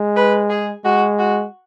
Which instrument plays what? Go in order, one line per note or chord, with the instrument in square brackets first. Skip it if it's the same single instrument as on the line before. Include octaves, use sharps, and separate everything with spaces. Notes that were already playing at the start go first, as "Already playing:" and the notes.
Already playing: [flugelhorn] G#3
[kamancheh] B4
G#4
[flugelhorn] G#3 [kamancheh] F#4
[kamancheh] F#4